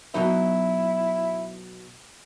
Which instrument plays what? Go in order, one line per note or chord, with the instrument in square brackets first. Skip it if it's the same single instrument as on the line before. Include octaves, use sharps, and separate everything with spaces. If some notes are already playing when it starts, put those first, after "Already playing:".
[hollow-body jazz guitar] B2 F#3 D#4 [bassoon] E4